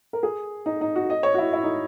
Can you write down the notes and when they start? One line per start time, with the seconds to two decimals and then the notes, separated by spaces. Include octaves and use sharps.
0.13 A#4
0.23 G#4
0.66 D#4
0.81 D#4
0.96 F#4
1.10 D#5
1.23 C#5
1.34 F#4
1.38 E4
1.53 E4
1.63 D#4